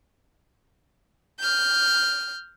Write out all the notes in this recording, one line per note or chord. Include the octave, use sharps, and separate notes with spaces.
F6 G6